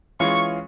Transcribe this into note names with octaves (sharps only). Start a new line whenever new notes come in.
E3 G#3 C#4 F4 C#6